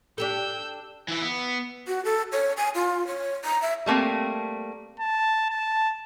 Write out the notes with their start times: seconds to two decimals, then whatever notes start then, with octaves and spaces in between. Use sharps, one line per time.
0.18 D4 G4 A4 E6 G6
1.08 E3 E5
1.22 B3
1.88 F#4
2.05 A4
2.32 C#5
2.57 G#5
2.75 F4
3.07 C#5
3.45 A#5
3.62 E5
3.86 G3 A3 A#3 C4
5.00 A5
5.50 A5